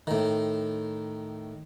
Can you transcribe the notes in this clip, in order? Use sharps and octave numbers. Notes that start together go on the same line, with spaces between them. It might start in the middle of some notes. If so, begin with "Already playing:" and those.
A2 D#3